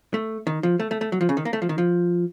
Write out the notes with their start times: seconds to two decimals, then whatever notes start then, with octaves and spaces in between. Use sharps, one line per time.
0.14 A3
0.47 D#3
0.63 F3
0.80 A3
0.91 A3
1.01 A3
1.12 F#3
1.21 F3
1.29 C#3
1.37 D#3
1.45 A#3
1.53 A3
1.62 F3
1.69 D#3
1.78 F3